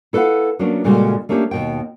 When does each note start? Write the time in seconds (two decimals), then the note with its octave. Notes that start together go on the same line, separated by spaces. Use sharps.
0.13 E4 A4 B4 C#5 F5 F#5
0.59 F#3 A#3 B3 C#4 D4
0.84 A#2 C#3 G3 G#3 F#4 A4
1.29 A3 A#3 C#4 D4 G4
1.51 D#2 B2 G5